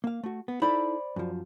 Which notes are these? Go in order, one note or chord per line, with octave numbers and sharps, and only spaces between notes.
A#3 F5
A3 F#4
B3
D#4 E4 A4 C5 D5 B5
F#2 F3